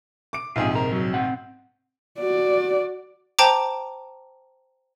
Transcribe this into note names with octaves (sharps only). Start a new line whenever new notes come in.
D6 D7
A#1 G#2 C3 F4 G#4
A#4
F#3
C4 F#5
F#4 D5
C5 G5 A5 A#5 D6